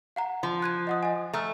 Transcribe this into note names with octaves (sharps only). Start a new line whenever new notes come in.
F5 F#5 A#5
F3
F#6 G#6 D#7
D#5 F#5 D#6
D#5 G#5
A3 A#5 E6 F6